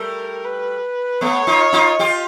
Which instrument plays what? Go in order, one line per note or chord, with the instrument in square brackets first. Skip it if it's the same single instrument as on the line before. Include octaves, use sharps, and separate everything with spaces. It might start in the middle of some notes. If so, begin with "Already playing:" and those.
Already playing: [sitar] G3 A3 [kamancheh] A#4
[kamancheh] B4
[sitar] A3 B3 [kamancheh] C#5
[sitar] D#4 F4
D#4 F4
F4 G4